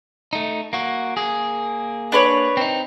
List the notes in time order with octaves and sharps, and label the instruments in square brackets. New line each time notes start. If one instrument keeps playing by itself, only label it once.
[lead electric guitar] A3 D#4
A#3 F#4
A#3 G#4
[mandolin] D4 B4 C#5
[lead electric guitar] C4 D#4